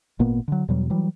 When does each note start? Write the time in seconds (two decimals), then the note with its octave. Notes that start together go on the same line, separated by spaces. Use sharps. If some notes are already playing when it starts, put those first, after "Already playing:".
0.19 G#1 A#2 A#3 B3
0.48 D3 F#3
0.68 E2 B2 F#3 G3
0.90 E3 F#3 G3